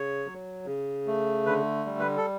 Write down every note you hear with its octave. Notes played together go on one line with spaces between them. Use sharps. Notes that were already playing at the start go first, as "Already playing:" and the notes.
Already playing: C#3 C#5
F#3
C#3
A3
D3 B4
G3
B4
A4